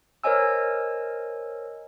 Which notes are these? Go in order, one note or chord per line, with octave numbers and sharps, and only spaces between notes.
A#4 C5 C#5 D#5 G#5 E6